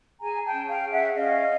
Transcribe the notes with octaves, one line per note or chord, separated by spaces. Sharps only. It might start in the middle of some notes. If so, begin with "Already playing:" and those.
G#4 G#5 A#5
G5 A5
C#4
F5 G5
G#4
E5 F#5
C#4 D#5 F5